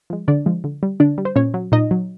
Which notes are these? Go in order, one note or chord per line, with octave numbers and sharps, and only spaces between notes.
F3 G#3
D3 D4 D5
F3 G#3
D3
G3
D3 D4 D5
G3
C5
A#2 C#4 C#5
F#3
A#2 D#4 D#5
F#3